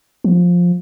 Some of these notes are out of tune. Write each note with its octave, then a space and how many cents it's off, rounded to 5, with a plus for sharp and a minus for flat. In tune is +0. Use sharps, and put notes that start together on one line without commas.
F3 +10